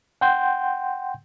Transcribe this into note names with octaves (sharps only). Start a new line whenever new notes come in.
F#5 G5 C6 G6